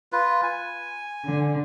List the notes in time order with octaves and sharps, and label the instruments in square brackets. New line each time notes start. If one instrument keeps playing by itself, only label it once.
[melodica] F4 B4
G#5
[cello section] D3